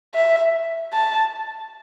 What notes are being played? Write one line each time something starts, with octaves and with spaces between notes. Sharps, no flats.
E5
A5